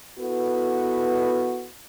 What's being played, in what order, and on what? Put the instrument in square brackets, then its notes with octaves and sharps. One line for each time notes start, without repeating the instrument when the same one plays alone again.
[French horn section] B3 E4 F#4 A4 B4